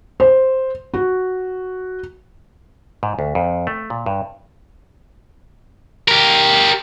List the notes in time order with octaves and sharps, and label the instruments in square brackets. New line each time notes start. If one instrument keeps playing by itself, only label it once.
[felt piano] C5
F#4
[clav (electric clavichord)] G#2
D2
F2
A3
A#2
G2
[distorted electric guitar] G4 A#4